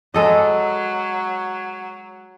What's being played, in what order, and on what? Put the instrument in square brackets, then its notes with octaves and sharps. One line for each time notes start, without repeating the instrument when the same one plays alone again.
[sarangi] F#3 [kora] G#3 A4 D#5